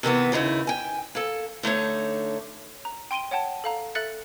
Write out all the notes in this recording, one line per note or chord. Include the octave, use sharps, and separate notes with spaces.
C3 D#3 E3 B3
D#2 C#3 D#4 E4
G5 G#5
A#3 A4
D3 A3 D#4 C#5
A#5
G5 C6 D7 D#7 G7
C#5 F#5 G5 A5
A4 F5 A#5
A4 E5 F#6 A6 C#7